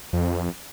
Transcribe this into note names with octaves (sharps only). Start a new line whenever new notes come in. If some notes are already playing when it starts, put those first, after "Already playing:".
F2